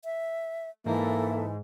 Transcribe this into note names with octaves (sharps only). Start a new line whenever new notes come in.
E5
G#2 E3 A#3 A4 E5 A5